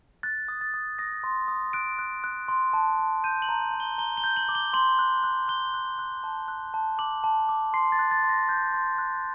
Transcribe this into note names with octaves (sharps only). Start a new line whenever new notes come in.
F#6 A6
D#6
A6
D#6
D#6 A#6
C6
D#6
F#6 D7
F#6
F#6
C6
A5
A5
G6 D#7
F#7
A#5
A#5
G7
A#5 G7
G7
G6
F#7
D6
G7
C6 F#7
F#6
F#6
F#6 G7
F#6
F#6
A5
F#6
A5
D6 F#7
A5
D6
C6 C7
A6
F#6
A6
C6
A#6
F#6 G6
C6
F#6